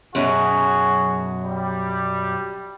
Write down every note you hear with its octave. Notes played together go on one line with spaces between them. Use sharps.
F#2 B2 F#3 F#4 G#4
G3